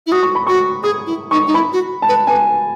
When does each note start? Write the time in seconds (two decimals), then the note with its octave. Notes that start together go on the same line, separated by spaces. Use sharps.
0.07 E4
0.12 F#4 D#6
0.23 C#6
0.35 B5
0.47 F#4 C#6
0.83 G#4 D#6
1.06 E4
1.31 D#4 C#6
1.47 D#4
1.54 E4 B5
1.73 F#4
2.02 A5
2.08 B4
2.26 B4 G#5